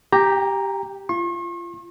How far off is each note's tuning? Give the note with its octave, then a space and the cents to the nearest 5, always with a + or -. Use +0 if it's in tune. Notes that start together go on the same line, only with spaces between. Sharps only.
G4 +0 G5 +40 A#5 +0
F4 -25 C#6 -45